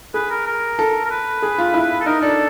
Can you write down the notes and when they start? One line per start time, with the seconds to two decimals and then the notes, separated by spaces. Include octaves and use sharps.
0.14 G#4 B4
0.31 A#4
0.46 A#4
0.79 A4
1.05 A#4
1.10 B4
1.43 G#4
1.58 F4
1.74 E4
2.01 A4
2.06 D#4 A#4
2.22 D4 A4